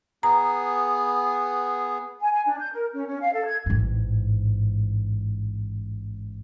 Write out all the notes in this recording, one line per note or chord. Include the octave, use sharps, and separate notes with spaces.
B3 G#4 A#5
G#5
G#5
D4
G6
A#4
C#4
C#4
F5
A4
G#6
A1 G#2